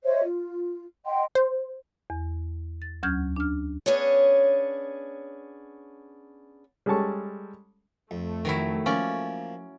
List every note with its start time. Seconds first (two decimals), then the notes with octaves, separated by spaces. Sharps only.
0.04 C5 C#5 D#5 E5
0.23 F4
1.05 D#5 F#5 G5 C6
1.35 C5
2.10 E2
2.82 A6
3.03 D2 F#3 C#4 F6 G6 G#6
3.36 D4 F6
3.86 B3 C#4 D4 G#4 C#5
6.86 G3 G#3 C#4 A4 A5 C#6
8.11 F2 A3
8.45 D#3 F#3 E4
8.86 F3 A#3 C#4 D5